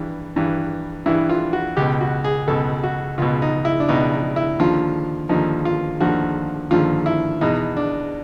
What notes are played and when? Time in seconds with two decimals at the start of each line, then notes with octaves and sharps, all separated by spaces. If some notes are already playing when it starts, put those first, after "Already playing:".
Already playing: G2 E3
0.36 G2 E3
1.06 G2 E3 E4
1.29 F4
1.53 F#4
1.77 C#2 B2 G4
2.01 F#4
2.24 G#4
2.48 C#2 B2 A4
2.83 F#4
3.18 C#2 B2 F4
3.42 D#4
3.65 E4
3.80 D4
3.89 C#2 B2 D#4
4.12 D#4
4.36 E4
4.59 D#2 D3 F3 F4
5.29 D#2 D3 F3 D#4
5.65 F4
6.00 D#2 D3 F3 F#4
6.71 D#2 D3 F3 F4
7.06 E4
7.41 E2 B2 D#4
7.77 D4